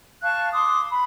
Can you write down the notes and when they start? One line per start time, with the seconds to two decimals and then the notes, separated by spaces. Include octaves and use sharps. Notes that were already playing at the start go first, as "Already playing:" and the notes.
0.22 F5 A5 C#6 F#6
0.53 C6 D6 D#6
0.89 B5